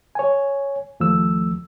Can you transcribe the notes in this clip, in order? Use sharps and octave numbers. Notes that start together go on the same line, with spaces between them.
C#5 G#5
D#2 F3 A3 E6